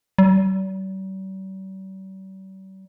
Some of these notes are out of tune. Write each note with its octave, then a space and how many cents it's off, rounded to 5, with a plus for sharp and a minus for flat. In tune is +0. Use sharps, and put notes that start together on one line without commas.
G3 -45